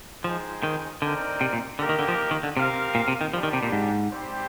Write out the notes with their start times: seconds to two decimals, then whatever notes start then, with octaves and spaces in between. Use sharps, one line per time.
0.24 F3 G#3 D#4 G#4 C5 G5
0.63 D#3
1.02 D3 C4 D#4 A#4 D5 G5
1.41 C3
1.53 A#2
1.79 D3 A#3 D#4 G4 A#4
1.89 D#3
1.99 D3
2.08 F3
2.31 D#3
2.43 D3
2.57 C3 C4 G4 A#4 F5
2.95 A#2
3.08 C3
3.21 D#3
3.33 F3 G3 D4 G4
3.43 D#3
3.53 C3
3.63 A#2
3.72 G#2
4.11 G3 C4 G4 C5